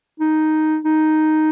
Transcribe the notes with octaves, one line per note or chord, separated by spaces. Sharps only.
D#4
D#4